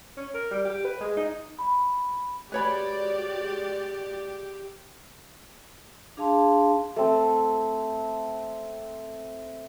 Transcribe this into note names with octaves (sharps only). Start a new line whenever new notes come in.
C#4
A#4
G3
G4
B4
G#3
D#4
B5
G#3 F#4 G4 B4 C#5 D5 B5
D4 G#4 F5 A5 C6
A3 C4